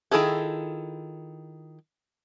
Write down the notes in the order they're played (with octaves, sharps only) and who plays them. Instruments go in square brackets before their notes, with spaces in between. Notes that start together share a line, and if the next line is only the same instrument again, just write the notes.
[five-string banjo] D#3 E4 F4 G#4 A4